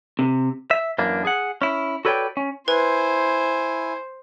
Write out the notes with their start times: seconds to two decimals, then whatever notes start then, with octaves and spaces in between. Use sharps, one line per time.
0.19 C3
0.71 E5
0.98 F#2 E3 A#3 D4
1.25 G#4 F#5
1.62 C#4 E4
2.05 F#4 A4 B4 C#5 D5 G5
2.37 C#4
2.68 E4 B4 C5 G#5